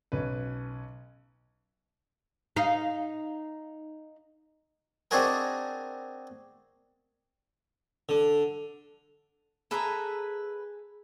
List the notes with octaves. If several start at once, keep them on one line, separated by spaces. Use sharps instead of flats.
B1 C#4 B4
D#4 F5
C4 D4 D#4 F#4 G#4 A#4
D3
G#4 A4 B4 E5 A#5